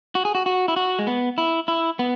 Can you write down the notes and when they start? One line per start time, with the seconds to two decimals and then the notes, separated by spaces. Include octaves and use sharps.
0.15 F#4
0.25 G#4
0.35 F#4
0.46 F#4
0.68 E4
0.76 F#4
0.99 G#3
1.07 B3
1.38 E4
1.68 E4
1.99 B3